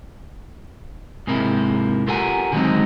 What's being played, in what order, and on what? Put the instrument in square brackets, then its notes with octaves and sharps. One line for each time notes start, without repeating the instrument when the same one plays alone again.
[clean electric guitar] G#2 C3 A#3 E4
F4 G4 A4 A#4 F#5 G#5
D3 D#3 F#3 G#3 C4 D#4